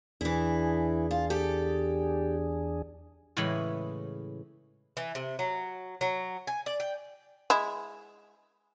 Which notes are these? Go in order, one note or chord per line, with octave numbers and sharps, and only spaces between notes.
E2 E3 D4 E4 G#4
F4
G4 A4
A2 C#3 E3 G#3 C#4 B5
E3
C3
F#3
F#3
G#5
D5
G5
G#3 E4